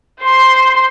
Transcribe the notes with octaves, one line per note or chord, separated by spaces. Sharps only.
C5 C6